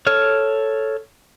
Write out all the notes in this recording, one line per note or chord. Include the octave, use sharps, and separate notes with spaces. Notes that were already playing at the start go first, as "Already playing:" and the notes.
A4 C#5 F6